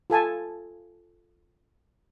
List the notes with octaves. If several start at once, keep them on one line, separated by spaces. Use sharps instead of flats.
F4 A4 G#5 A5